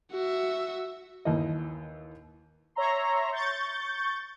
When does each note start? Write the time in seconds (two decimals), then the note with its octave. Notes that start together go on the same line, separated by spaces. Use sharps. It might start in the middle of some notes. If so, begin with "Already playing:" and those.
0.11 F#4 E5
1.25 D#2 E3 D#5
2.75 C#5 E5 A#5 C6
3.31 C#6 G6 A6